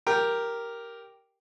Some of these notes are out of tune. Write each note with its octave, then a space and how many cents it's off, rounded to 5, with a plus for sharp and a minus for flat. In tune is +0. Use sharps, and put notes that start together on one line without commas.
G4 +0 A#4 +0 G5 +0